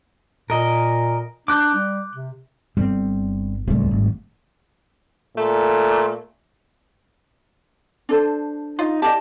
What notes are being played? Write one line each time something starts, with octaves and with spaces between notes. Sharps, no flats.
A#2 A#4 D#5
D4 D6 F#6 G6
G3
C3
G1 G3 C4
D1 C#2 G3 A3
G#1
A#2 A3
D4 A4 C5
D#4 F4
E4 G4 D5 D#5 G#5 A5